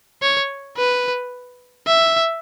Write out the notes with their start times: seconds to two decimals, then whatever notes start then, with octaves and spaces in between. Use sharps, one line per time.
0.22 C#5
0.77 B4
1.86 E5